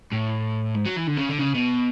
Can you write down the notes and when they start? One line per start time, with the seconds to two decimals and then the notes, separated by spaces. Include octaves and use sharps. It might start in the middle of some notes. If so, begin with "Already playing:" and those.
0.13 A2
0.76 G#2
0.86 F#3
0.97 E3
1.08 D3
1.18 C#3
1.29 D3
1.39 C#3
1.54 B2